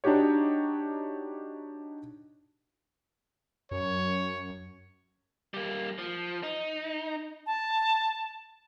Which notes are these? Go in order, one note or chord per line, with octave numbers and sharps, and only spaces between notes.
D4 D#4 F#4 G4 C#5
F#2 C#5
G3 A#3
F3
D#4
A5